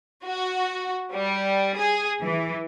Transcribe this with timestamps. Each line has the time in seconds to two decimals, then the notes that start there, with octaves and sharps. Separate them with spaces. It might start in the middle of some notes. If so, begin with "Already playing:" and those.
0.24 F#4
1.12 G3
1.76 G#4
2.21 E3